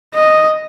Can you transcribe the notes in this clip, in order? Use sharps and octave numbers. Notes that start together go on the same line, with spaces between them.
D#5